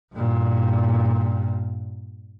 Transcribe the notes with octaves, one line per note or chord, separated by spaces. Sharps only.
G2 A#2